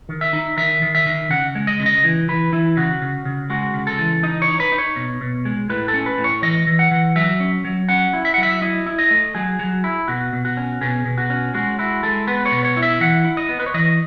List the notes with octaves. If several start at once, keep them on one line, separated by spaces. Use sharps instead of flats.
D#3
E5
D#4
D#3 E5
D#3
E5
D#3
C#3 F#5
G#3
D#5
C#3
D#5
E3
E3 B4
E3 E4
C#3 F#4
C#3
C#3
G#3 F#4
C#3
A4
E3
D#4 D#5
C#5
D#4
B4
D#4
C#5
B2
B2
G#3
A2 B4
A4
C#4
B4
A2
C#5
E3 D#5
E3
F#5
E3
F#3 E5
C#4
F#3
C#4 F#5
E4
E5
F#5
F#3
E5
E4 D#5
E4
D#5
A3
F#3 G#4
F#3
E4
B2 F#4
B2
F#4
C#4
B2 G#4
B2
F#4
C#4
G#3 F#4
E4 F#4
G#3 A4
B3 B4
C#5
B2
C#5
E4
E5
E3 F#5
E4
D#5
B3
B4
C#5
E3 D#5